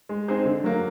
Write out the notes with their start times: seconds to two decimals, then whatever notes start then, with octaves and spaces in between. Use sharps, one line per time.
0.09 G#3
0.28 C4 D#4 G#4 C5
0.45 D3
0.64 F#3 A#3